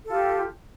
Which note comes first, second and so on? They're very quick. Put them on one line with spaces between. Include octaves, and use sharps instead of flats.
A4 F4 G4